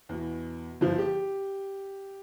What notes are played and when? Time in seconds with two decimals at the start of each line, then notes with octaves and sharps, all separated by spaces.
0.09 E2 B2
0.81 G1 F3
0.98 G4